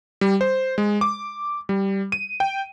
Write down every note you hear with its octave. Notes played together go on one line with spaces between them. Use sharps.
G3
C5
G#3
D6
G3
D#7
G5